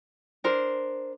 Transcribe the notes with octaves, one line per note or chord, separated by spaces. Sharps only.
D4 A#4 C5